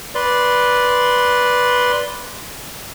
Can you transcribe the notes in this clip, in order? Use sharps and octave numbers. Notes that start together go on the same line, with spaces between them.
B4 D5 C6